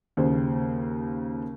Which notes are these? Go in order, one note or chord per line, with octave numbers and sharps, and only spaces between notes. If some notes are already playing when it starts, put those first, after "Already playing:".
D#2 C#3 C5